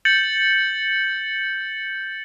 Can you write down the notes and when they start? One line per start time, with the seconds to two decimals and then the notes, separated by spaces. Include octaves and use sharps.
0.05 G6 A6 C#7 F#7